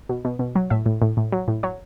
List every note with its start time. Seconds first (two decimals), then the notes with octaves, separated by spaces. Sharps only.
0.09 B2
0.25 B2
0.39 B2
0.55 F#3
0.70 A2 E5
0.86 A2
1.02 A2
1.17 A2
1.32 F#3
1.48 A2
1.63 F#3 C#5